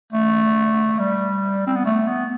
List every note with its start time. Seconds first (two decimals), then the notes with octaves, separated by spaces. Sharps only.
0.13 A3
0.99 G3
1.67 C4
1.76 B3
1.85 A3
2.08 B3